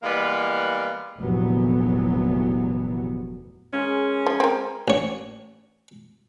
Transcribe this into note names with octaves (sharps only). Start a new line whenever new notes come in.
E3 G3 G#3 A#3 B3
F1 D2 A#2 E3 F#3 B3
G#3 C#4 F4 A#4
F3
C4 A#4
A1 C#5